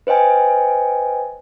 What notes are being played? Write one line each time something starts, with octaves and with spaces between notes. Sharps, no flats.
B4 C5 D#5 G5 G#5